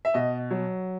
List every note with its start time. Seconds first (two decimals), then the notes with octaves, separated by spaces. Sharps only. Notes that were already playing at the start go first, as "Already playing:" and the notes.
0.05 E5
0.14 B2 D#5
0.51 F#3